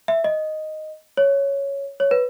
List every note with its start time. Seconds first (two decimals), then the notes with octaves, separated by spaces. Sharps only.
0.08 E5
0.24 D#5
1.17 C#5
2.00 C#5
2.11 B4